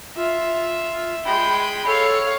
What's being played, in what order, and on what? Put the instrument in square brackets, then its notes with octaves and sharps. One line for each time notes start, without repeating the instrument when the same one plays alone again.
[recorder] F4 [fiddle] E5
[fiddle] G#3 G5 [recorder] B5
[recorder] A4 [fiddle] C#5 F5